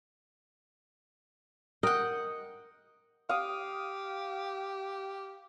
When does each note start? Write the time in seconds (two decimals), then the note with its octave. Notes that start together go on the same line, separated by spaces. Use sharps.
1.83 A#4 D#5 F#5 G5
3.29 G4 F5 D#6